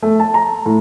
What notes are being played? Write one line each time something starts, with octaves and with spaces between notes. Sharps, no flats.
A3
A5
A#5
A2